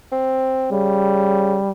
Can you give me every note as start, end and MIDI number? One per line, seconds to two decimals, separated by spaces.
0.12 0.71 60
0.72 1.58 49
0.72 1.71 55